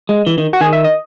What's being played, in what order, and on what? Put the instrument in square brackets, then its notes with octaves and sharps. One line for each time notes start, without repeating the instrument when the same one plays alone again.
[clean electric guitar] G#3
E3
D#3
[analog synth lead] F#4
[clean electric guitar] D#3 [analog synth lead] G#4
[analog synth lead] E5
D#5